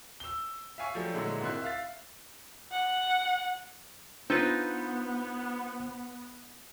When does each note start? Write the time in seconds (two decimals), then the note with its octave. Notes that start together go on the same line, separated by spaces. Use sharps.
0.20 E6 G7
0.78 E5 F5 G#5 C#6
0.95 F3 F#3 A3 D4 G4
1.14 A#2 D3 F#3 G#3 A3 E4
1.41 G#1 D#3 C4 E4 C6 F#6
1.62 E5 F5 A6
2.71 F#5
4.30 B3 D4 D#4 F4 B4 C5 E6 G6